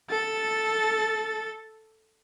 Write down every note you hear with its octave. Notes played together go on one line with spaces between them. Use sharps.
A4 A6